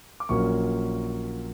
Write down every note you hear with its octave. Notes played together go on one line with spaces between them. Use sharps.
D6
A#1 A#2 F#3 A#3 C#4 C#6